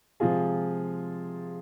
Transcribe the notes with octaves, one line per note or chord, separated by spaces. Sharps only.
C3 F3 G#3 F4 G#4